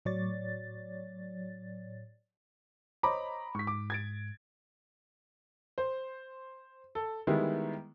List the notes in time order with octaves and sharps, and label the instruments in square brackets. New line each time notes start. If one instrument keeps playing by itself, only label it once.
[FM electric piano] A2 F#3 C#5 D5 A6
[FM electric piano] C5 C#5 D#5 [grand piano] A#5 B5 D6
[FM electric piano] G#2 [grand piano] C#6 B6
[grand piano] D6
G#6 A6 D7
C5
A4
D#3 G3 G#3 B3 E4